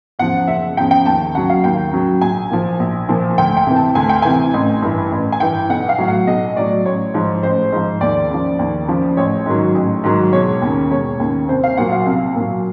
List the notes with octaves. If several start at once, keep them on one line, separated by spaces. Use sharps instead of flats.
E2 C#3 F3 F#5
F#1 E5
E2 C#3 F3 G5
G5
D#2 A5
C#3 F#3 F#5
F5
D#2 G5
C#3 F#3
A#1 G#5
A#2 F3
A#1
A#2 F3
D2 G5
G5
C3 E3
A5
D2 G#5
G5
C3 E3 G#5
A1
G2 E3
A1
G#5
G2 E3 G5
B1 F#5
F5
A2 F#3
F#5
B1 D#5
A2 F#3 D5
A1 C#5
G#2 F3
A1 C5
G#2 F3
D#2 D5
C#3 F3
D#2
C#3 F3
A1 C#5
G#2 D#3 F#3
A1
G#2 D#3 F#3
E1 C#5
D#2 C#3
E1 C#5
D#2 C#3
C2 C5
F5
A#2 F#3 F#5
F5
C2
A#2 F#3